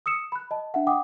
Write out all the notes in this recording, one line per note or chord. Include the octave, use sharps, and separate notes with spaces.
D#6 E6 C#7 E7
B5 F#6
D#5 A5
D4 E5 F#5
F#5 G5 D6 D#6